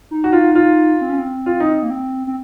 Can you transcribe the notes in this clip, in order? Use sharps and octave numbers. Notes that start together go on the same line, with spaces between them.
D#4
F#4
F4
F4
C4
C#4
C4
F4
D#4
A#3
C4
C4